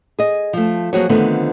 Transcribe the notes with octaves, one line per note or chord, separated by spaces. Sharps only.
G#4 D#5
F3 A3
F3 F#3 A#3 F#4 G#4 C#5
D3 D#3 F3 A3 B3 C4